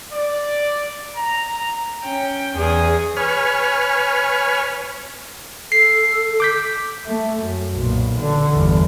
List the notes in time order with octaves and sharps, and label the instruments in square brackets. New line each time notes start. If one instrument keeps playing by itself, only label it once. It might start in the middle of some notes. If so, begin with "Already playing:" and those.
[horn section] D5
A#5
[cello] C#4 G5
E2 G#4
[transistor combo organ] B4 C#5 G#5 F6
[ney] A4 [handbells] C7
[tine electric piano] D6 G6 B6
[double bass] A3
F#2
B1 A#2
D3
G1 E2